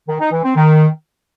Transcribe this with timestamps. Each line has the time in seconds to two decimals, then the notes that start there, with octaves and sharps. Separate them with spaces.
0.08 D#3
0.20 D#4
0.32 E3
0.44 C4
0.56 D#3